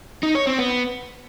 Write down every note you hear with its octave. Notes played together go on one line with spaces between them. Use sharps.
D#4
C#5
C4
B3